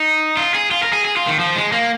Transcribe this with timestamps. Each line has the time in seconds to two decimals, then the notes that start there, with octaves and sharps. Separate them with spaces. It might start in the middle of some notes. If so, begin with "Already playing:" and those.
Already playing: D#4
0.37 F4
0.55 G#4
0.71 F4
0.83 A#4
0.93 G#4
1.05 G#4
1.16 F4
1.27 D#3
1.39 F3
1.56 G#3
1.72 A#3